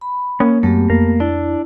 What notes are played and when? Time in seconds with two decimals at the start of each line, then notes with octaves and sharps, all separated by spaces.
0.01 B5
0.40 A#3 C#4
0.63 F#2 A3 B3 G4
0.90 F2 A#3
1.20 D4 E4